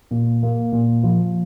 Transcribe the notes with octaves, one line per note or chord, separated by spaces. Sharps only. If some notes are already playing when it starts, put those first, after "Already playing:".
A#2
A#3
A#2
F3